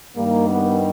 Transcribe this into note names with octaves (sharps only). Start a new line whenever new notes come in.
G2 D#3 G3 A#3
B3